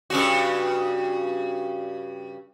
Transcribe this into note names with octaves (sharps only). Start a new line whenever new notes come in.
G2 C#3 F#4